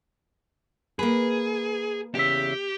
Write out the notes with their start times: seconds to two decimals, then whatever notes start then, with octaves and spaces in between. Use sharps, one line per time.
0.99 A#3 G#4 B4
2.15 E2 C#3 G4 E5